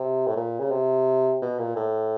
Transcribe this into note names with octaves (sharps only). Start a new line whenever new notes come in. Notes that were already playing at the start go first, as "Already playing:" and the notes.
Already playing: C3
A2
A#2
C#3
C3
B2
A#2
A2